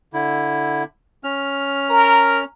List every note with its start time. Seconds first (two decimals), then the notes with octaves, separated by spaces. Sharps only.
0.14 D3 E4
1.24 C#4 F6
1.90 A#4 A#5